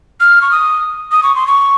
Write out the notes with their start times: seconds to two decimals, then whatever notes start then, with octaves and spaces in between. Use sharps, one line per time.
0.20 F6
0.42 C#6
0.51 D#6
1.12 D#6
1.23 C#6
1.35 C6
1.47 C#6